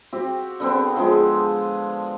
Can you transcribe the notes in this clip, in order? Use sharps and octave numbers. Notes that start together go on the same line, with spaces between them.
C4 F#4 G4
D3 B3 C4
D3 F3 G#3